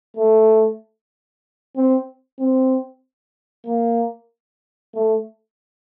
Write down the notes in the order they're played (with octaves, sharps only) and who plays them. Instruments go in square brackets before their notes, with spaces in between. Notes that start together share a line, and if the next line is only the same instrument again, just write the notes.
[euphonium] A3
C4
C4
A#3
A3